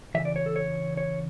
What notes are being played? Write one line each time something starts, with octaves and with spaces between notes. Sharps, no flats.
C#3 E3 E5
D5
C#5
A4
C#5
C#5